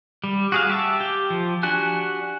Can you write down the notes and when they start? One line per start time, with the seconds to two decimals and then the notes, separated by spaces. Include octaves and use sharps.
0.24 G3
0.52 F#4 G#4 F5
0.70 G4 E5 A5
1.00 G4
1.30 F3
1.63 D4 F#4 G4 G#5 F#6